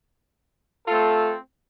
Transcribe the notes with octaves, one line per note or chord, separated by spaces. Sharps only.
A3 C4 F4 A4